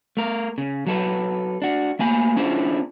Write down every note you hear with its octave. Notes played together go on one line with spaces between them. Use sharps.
A3 A#4
C#3
F#3 A4 B4
D4 F#4
A3 A#3 G#5 B5
C#4 D4 E4 F4 G#4 C5